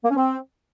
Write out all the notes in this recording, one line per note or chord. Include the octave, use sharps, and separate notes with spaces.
A#3
C#4
C4